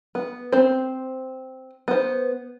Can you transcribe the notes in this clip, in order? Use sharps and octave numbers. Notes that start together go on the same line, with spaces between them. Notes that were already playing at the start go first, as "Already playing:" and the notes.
B3
C4 C5
B3 C5